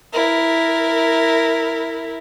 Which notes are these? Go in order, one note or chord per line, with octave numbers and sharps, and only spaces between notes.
E4 A#4